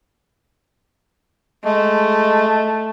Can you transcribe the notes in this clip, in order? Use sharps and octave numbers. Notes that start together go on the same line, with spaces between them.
G#3 A3